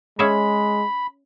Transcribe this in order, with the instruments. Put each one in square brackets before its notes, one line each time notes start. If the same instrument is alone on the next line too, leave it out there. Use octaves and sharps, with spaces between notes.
[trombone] G#3 [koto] C#4 G#4 E5 [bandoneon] B5